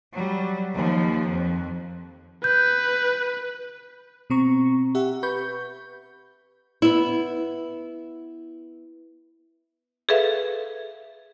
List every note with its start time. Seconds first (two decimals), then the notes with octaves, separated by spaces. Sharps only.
0.13 F#3 G3
0.75 D#2 F3
1.28 F2
2.44 B4 G6
4.30 B2 C4 A#5 C#6
4.95 G4 E5 F#5
5.23 B4 B5 C#6 G6
6.82 B3 E4
10.09 G#4 A4 B4 E5 F5